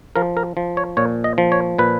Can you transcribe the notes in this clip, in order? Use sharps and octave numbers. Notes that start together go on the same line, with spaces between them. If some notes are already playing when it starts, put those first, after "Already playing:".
F3 A#4
A#4
F3
C#5
A#2 C#5
D#5
F3
C#5
A#2 B4